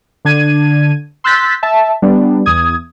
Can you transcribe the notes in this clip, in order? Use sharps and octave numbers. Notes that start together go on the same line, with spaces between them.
D3 D4 G#6 D#7
C6 E6 F#6 G6 A6 B6
E5 A5
G3 B3 D4
E2 D#6 G#6